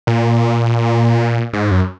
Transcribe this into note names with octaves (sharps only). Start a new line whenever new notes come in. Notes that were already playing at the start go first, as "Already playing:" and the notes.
A#2
G#2
F#2